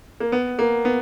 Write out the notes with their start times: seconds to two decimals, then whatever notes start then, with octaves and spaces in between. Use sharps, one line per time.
0.20 A#3
0.32 B3
0.59 A#3
0.85 B3